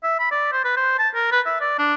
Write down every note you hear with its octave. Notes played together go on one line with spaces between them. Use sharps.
E5
B5
D5
C5
B4
C5
A5
A#4
B4
E5
D5
D4